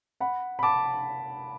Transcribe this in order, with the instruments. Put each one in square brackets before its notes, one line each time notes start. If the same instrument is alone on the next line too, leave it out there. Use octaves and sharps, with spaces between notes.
[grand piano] F#5 B5
B5
A5 D6